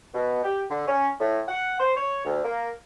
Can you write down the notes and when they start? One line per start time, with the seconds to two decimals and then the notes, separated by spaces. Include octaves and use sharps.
0.14 B2
0.44 G4
0.70 D3
0.88 C#4
1.20 A2
1.48 F#5
1.80 C5
1.97 C#5
2.25 D2
2.44 A#3